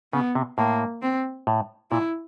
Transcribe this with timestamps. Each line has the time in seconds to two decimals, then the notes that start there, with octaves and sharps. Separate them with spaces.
0.13 C#3 B3
0.35 C3
0.58 A2 A#3
1.03 C4
1.47 A2
1.91 A#2 E4